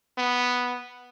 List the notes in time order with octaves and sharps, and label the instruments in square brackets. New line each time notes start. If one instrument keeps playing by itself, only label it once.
[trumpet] B3